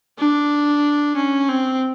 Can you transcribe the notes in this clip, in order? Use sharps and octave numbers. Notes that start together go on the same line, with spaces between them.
D4
C#4
C4